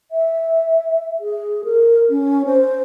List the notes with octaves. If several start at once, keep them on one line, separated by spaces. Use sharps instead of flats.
E5
G#4
A#4
C#4
C5